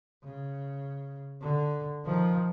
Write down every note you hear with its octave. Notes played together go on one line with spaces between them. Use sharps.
C#3
D3
D#3 F3